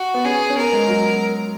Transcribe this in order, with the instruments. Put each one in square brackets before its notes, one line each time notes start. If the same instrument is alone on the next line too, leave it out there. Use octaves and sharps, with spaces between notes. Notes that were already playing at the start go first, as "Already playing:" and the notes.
Already playing: [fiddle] F#4
[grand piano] B3
[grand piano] C#4 [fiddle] G#4
[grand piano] C#4
[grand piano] B3 [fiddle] A#4
[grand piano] G#3
F#3